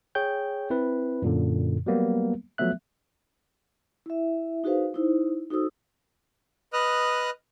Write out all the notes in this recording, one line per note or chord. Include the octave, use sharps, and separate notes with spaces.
G#4 C#5 G5 G6
C4 E4 B4
F#2 A#2 D3
F#3 G3 A#3 B3
F3 F#3 A3 B3 E5 F#6
E4 E5
D#4 F#4 G#4 B4 C5 F5
D#4 E4 C5
D#4 F#4 A4 C5 D#6 E6
B4 D#5 D#6 F6 F#6